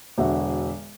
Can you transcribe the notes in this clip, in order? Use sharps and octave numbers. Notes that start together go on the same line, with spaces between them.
E1 D3 F#4 E5